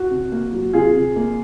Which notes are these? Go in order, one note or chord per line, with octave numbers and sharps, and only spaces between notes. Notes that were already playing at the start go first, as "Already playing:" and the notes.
Already playing: F#4
C3
A#3
F#3
C3 F4 G#4
C3
A#3